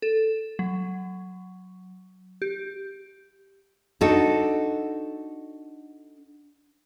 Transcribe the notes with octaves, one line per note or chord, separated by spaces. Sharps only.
A4
F#3
G4
D4 D#4 F#4 A4